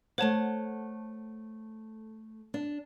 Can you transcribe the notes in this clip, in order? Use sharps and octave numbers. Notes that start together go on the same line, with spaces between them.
A3 C5 C#5 F#5 A5
D4